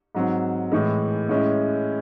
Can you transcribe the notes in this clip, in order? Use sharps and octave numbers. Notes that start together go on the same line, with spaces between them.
G#2 F#3 C4
A2 E3 G#3
A2 G#3 C#4 E4